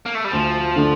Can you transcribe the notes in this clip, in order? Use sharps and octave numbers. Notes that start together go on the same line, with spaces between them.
A#3
A3
G3
D2 F3
D3 A3 D4